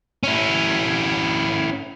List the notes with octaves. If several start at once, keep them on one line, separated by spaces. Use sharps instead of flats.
C#4 E4